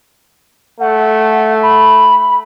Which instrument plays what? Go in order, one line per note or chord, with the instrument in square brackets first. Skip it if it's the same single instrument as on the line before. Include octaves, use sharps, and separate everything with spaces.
[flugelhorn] A3 [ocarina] F#5
[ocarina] B5